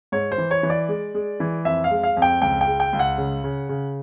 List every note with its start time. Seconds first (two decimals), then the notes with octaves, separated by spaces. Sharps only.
0.12 G#2 C#5
0.32 C5
0.38 E3
0.51 C#5
0.63 E3
0.70 D5
0.89 G#3
1.14 G#3
1.40 E3
1.65 F2 E5
1.84 F5
1.91 G#3
2.03 F5
2.17 F2
2.22 G5
2.42 C#2 G5
2.61 G5
2.67 G#3
2.80 G5
2.93 C#2
2.99 F#5
3.18 C#3
3.44 C#3
3.69 C#3